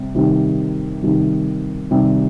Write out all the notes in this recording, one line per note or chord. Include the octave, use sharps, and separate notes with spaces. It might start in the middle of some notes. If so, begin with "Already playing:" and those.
Already playing: C3 G3
C3 D#3 G3
C3 D#3 G3
C3 D#3 G3